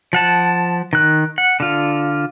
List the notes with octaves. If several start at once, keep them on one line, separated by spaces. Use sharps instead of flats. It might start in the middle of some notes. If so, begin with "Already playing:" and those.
F3 F#5 A5
D#3 F#6
F#5
D3 F4